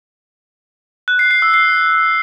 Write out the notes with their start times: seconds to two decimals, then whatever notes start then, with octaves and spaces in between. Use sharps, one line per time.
1.08 F#6
1.19 C7
1.31 C7
1.42 E6
1.54 C7